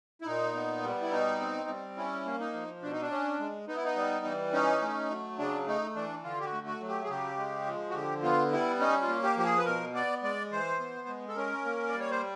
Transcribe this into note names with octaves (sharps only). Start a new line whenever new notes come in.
E4
A#2 D#4
B3
G3
E4
B2 D#4
C4
G3
C#4 E4
A#3
D#4
F3
B2 D4
D#4
D4
C#4
G#3
B3 D#4
E4
D#4
G3
E3
C#4 D#4
A3
F#3
C#3 D4
A3 D#4
E3 D4
D3 F4
G4
F#4
A3
F#4
F#3
G4
G#4
C#3 G4
G#3
F3
F#4
D3 G4
B3 F4
G3 E4
C#4 D#4
F4
A#3
G4
F3 G4
G#4
B4
B2 A#4
B3 D5
G#3 D5
E3 C5
B3
G#3
A4
C#4 A#4
A#3
D5
G3
C#5
C5